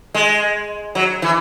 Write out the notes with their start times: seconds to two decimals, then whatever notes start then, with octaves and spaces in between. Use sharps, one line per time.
0.14 G#3
0.95 F#3
1.22 E3